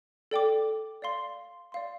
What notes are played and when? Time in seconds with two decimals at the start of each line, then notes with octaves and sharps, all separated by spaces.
0.31 A4 D5 G5 D6
1.02 D5 F5 C6
1.72 D5 F5 C6